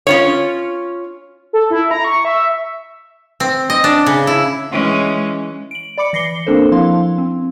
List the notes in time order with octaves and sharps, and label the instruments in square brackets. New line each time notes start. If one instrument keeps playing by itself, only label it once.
[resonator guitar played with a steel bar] C#4 F4 C#5
[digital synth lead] A4
E4
A#5
C#6
E5
[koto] C4
D#5
D4
C#3
E4
[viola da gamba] E3 G#3 C#4
[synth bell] D7 F#7
D5 B5 D6 C#7
E3 A#6 C7 C#7 G7
A#3 C4 D4 A4 A#4 C5
F3 E4 F5 C6
C4